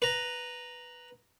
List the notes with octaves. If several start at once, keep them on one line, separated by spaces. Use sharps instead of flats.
B4 A#5